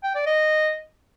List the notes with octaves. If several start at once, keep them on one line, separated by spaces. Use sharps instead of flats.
G5
D5
D#5